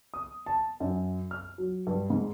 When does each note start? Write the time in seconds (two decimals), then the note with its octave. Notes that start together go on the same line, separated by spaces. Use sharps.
0.14 D#6
0.46 A5
0.80 F#2
1.31 F6
1.58 F#3
1.87 G2
2.10 G#2